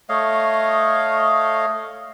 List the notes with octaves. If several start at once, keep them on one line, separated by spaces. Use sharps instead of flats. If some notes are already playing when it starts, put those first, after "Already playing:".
A3 C#5 D#5 F5